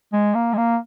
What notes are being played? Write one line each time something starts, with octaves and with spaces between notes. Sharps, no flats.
G#3
A#3
G#3
A#3